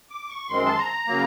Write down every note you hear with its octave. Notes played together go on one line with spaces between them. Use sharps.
D6
C#6
F#2 D#3 G#3 C4 C6
A5
A#5
C#3 F#3 A#3